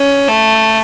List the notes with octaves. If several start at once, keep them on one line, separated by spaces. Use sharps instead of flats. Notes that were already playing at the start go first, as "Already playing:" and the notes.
Already playing: C#4
A3